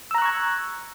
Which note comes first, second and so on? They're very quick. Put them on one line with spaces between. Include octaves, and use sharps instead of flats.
E6 A#5 F#6 C#6 G#6